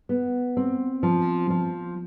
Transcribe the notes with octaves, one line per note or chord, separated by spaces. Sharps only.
B3
C4
F3
F3